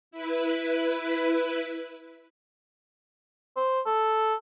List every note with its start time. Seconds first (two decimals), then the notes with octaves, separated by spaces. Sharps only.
0.11 E4 B4
3.56 C5
3.86 A4